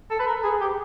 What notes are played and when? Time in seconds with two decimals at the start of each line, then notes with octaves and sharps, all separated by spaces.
0.11 A4
0.19 B4
0.27 A#4
0.44 G#4
0.61 G4